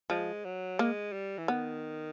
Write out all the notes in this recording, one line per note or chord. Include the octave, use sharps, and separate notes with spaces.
F3 G#3
F#3
G#3 A#3
G3
E3
D#3 B3